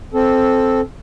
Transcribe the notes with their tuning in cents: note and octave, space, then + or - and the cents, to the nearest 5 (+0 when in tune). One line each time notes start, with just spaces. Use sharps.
C4 +0 A4 -10